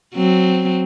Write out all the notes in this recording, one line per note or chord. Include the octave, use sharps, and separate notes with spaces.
F#3 C4